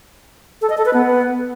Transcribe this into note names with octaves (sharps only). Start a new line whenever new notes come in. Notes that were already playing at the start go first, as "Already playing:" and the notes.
A4
D#5
A4
B4
B3